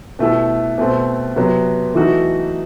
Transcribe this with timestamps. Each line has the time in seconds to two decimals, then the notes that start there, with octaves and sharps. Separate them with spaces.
0.19 B2 A3 E4 G4
0.78 B2 A3 C4
1.36 C3 F#3 B3
1.95 E3 A3 D#4 F#4